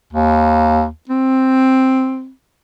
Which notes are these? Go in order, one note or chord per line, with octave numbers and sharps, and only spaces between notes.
D#2
C4